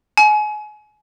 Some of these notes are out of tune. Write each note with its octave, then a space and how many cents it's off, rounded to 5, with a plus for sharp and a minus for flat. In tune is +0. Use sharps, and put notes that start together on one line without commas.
G#5 +30